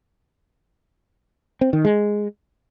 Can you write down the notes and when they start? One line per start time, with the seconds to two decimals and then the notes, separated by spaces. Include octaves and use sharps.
1.61 C4
1.73 D#3
1.85 G#3